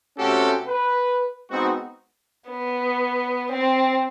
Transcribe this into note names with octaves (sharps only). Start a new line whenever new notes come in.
C3 A3 C#4 F#4 G4 A4
B4
G#3 B3 C4 D#4 F#4
B3
C4